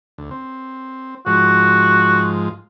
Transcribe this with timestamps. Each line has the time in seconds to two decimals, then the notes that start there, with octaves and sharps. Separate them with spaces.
0.18 D2
0.31 C4
1.26 G#2 F3 F#4